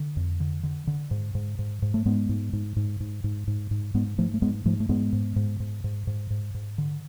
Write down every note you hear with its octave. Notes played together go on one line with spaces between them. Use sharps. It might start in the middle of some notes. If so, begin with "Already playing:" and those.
Already playing: D3
F2
D3
D3
D3
G#2
G#2
G#2
G#2
A3
G#2 G#3 B3
G#2
G#2
G#2
G#2
G#2
G#2
G#2
G#2 G#3 B3
G#2 F3 A3
A3
G#2 G#3 B3
G#2 F3 A3
A3
G#2 G#3 B3
G#2
G#2
G#2
G#2
G#2
G#2
G#2
D3